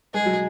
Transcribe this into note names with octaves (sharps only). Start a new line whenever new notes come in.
G#3 G#4
F#3